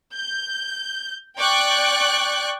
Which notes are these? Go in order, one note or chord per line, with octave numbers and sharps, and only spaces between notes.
G6
D5 G5 C#6 F#6